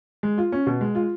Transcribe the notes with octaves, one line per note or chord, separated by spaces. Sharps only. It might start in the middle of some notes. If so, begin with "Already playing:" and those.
G#3
F4
C#4
B2
G#3
F4